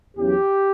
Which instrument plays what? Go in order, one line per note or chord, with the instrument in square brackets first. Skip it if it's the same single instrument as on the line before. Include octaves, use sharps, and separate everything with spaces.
[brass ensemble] E2 C#3 F#3 G4